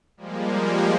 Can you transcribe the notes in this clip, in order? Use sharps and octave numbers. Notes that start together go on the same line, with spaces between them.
F3 G3 G#3 A#3